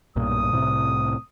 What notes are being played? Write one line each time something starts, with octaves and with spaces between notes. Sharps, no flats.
B1 G2 A#2 D#6
C2 A2 C3